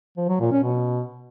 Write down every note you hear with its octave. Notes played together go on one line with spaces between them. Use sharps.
F3
F#3
A#2
C#4
B2